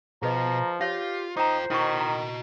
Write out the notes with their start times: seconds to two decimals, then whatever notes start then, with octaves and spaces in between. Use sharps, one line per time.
0.22 B2 F3 G#4 B4 D#5 A#5
0.81 F4 G4 C#5 F5
1.37 D#4 F4 C5 G5 A#5 D6
1.71 D#3 E4 F#4 D#5 B5 C#6
2.00 A#5